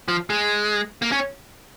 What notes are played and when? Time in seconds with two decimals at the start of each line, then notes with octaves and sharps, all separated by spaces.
0.08 F3
0.30 G#3
1.02 A#3
1.12 C#4